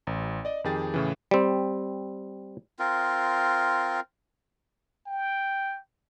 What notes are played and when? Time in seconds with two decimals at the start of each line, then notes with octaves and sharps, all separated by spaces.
0.07 A1
0.45 D5 D#5
0.64 F2 D#3 G4 G#4 G5 A6
0.94 A2 C#3 E3
1.31 G3 C4
2.79 C4 F4 A#4
5.06 G5